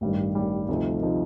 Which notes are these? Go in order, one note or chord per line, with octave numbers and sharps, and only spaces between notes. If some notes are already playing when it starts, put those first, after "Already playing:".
A1 G2 D#3 G3
A1 G2 D#3 G3
D2 C3 F3 A3 D#4
C3 F3 A3 D#4